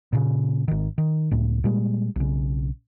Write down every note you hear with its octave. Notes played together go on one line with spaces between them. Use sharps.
A#2 C#3
G#1 D#3
D#3
C#2 A2
A#2 G3 G#3
B1 C#3